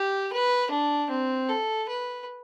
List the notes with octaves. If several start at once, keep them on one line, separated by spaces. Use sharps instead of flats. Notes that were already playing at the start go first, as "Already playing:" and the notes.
Already playing: G4
B4
D4
C4
A4
B4